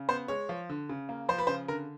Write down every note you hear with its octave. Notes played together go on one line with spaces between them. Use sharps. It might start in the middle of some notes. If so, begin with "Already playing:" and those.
Already playing: C#3
B3 C5
G#3 C#5
F3
D3
C#3
A#3
F3 C5
B4
C#3 C5
D3 A#4